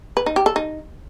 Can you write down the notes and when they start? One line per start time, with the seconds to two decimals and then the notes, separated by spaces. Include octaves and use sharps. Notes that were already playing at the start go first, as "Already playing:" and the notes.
0.17 B4
0.26 D#4
0.36 G4
0.46 A4
0.56 D#4